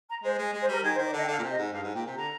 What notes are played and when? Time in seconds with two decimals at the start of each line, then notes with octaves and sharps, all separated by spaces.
0.09 A#5
0.23 G#3 C5
0.38 G#3
0.53 G#3
0.61 C5
0.68 G3 A#4
0.83 D#3 G#4
0.94 C5
0.98 D#3
1.06 D5
1.13 D3 D#5
1.22 G5
1.28 D3 F5
1.39 A#2
1.42 C3
1.50 D#5
1.57 G#2
1.72 G2 F5
1.83 G#2
1.94 A#2 G5
2.06 C3
2.16 D3 A#5